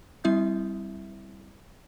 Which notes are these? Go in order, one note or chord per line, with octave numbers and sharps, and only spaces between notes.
G3 C4 E4 E5 D#6 G6